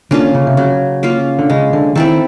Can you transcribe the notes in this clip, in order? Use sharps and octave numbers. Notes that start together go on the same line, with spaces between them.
D3 A#3 C#4 F4
C#3
C3
C#3 F#3
A#3 C#4 F4
D3
C#3 G#3
D3
D#3 C4 E4 A4